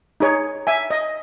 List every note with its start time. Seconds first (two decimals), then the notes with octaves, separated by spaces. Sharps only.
0.20 D#4 G#4 C#5
0.67 E5 G#5
0.91 D#5